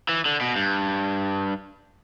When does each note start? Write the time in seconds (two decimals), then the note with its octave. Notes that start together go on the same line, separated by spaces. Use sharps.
0.09 E3
0.25 D3
0.41 B2
0.56 G2